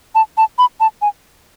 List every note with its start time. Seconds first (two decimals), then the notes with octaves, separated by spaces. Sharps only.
0.15 A5
0.37 A5
0.58 B5
0.80 A5
1.02 G#5